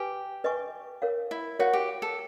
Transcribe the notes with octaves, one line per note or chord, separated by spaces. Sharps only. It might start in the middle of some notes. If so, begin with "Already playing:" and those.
Already playing: G4 B4 G#5
B4 D#5 G#5 C#6
A#4 C#5 F5
E4
F#4 A#4 C#5 F5
G4
A4